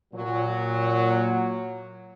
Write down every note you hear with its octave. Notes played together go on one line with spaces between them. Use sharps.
A#2 F#3